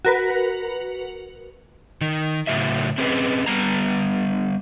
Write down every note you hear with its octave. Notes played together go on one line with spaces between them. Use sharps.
F#4 A#4 B4
D#3
A2 C#3 F#3 E5
C4 C#4 G#4 B4 D#5
D3 G3 B3 A#5